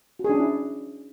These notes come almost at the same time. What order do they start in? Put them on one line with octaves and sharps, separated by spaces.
F#4 G#4 D4 C#4 E4